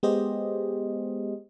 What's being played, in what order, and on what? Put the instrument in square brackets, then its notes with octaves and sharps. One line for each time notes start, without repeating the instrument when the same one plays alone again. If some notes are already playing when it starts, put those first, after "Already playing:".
[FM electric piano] G#3 B3 G4 G#4 C5 D#5